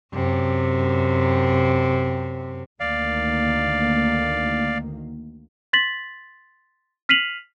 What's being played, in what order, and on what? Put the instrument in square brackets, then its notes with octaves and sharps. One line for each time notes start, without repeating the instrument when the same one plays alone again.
[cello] F#2 C3
[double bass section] D2 D#3 A#3 [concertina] D5 F5
[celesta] C6 A6 B6 F#7
F6 B6 C7 D#7 F7 F#7